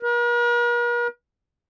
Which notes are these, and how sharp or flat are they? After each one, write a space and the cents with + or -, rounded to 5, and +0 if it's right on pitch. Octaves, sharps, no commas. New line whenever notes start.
A#4 +45